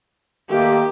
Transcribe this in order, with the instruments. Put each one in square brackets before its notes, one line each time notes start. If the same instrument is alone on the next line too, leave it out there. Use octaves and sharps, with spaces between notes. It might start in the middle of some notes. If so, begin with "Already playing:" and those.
[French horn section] D#3 A3 A#3 [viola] G4